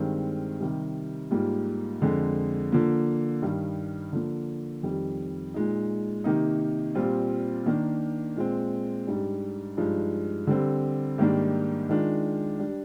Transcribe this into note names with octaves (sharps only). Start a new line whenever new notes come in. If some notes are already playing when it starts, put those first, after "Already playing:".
Already playing: G2 D#3 G#3 C4
C3 D#3 G3
G#2 G3 A#3 F4
F2 D3 G#3
D3 F3 A#3 F4
G2 D#3 G3
D3 F3 A#3
F2 D#3 G3
A#2 G#3 D#4
C3 D#3 A#3 D#4
A#2 G3 C4 F4
D#3 A#3 D4
A#2 G#3 C4
G#2 G3 D4
G2 F3 G#3 D#4
D3 G3 C4
G#2 D#3 G3 A#3 D4
D#3 G#3 D4 F4
G3 D4